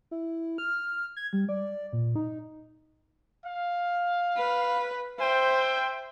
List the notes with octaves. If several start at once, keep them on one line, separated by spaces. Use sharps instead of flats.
E4
F6
G#6
G3
D5
A#2
D#4
F5
B4
C5 E5 G5